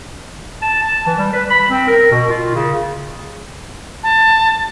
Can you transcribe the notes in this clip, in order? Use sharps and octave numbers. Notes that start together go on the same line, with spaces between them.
A5
A5
E3
G3
B4
B5
C4
A#4
B2
F4
C#3
A5